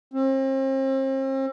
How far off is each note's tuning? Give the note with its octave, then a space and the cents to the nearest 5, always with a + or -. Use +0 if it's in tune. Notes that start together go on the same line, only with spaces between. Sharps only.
C4 +40